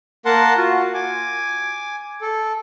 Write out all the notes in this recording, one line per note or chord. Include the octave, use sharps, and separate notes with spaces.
A#3 A#4 F#5 A5 C6
F4 F#4
G#5 D6
A4